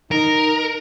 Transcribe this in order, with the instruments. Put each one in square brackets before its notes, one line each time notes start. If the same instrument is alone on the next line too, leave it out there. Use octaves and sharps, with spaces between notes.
[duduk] D#4 [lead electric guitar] A#4